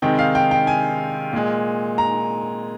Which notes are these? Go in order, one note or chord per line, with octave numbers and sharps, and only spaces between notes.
C3 D#3 G#3 G5
F5
G5
G5
G#5
A#2 G#3
A#5